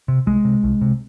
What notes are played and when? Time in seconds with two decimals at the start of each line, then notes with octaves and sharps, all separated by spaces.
0.08 C3
0.26 C2 G#3
0.45 C3
0.63 C2
0.81 C3